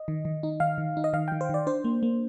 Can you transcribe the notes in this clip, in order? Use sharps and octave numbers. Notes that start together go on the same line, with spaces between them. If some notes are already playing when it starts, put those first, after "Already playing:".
Already playing: D#5
D#3
D#3
D#4
D#3 F5
D#3
D#4
D#5
D#3 F5
D#3 G5
C5
D#3 D5
D4 C5
A#3
A#3